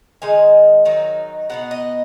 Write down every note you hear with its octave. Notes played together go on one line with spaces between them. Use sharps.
D#3 G#3 D#4 G#5
D#3 F#3 D#4
B2 B3 D#4 F#5
D#5